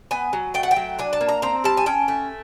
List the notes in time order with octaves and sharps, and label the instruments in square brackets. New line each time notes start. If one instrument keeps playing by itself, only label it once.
[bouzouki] B3 G#5
F#3
A3 G5
F#5
G5
F#3
D4 G#5
A5
A#3
A#5
C4 A#5
G3 A5
G#5
C#4 G5
A3